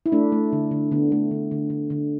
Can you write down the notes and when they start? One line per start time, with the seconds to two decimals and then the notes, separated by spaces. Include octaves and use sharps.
0.06 E4
0.12 A3 D4
0.32 A3
0.53 D3
0.71 D3
0.91 D3 B3
1.12 A3
1.31 D3
1.51 D3
1.70 D3
1.90 D3